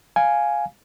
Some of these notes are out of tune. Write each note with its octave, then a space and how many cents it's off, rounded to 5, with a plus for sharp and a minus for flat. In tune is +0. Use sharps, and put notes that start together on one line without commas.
F5 +0 G#5 +5